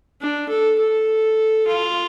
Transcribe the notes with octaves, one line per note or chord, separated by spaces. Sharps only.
D4
A4
A4
F4